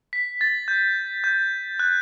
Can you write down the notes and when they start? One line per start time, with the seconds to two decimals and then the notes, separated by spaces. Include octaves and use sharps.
0.13 B6
0.41 A6
0.68 G6
1.24 G6
1.79 F#6